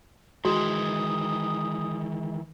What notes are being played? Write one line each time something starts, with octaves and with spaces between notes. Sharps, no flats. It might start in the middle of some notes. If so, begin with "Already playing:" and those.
D#3 E3 G#3 F#4 D#6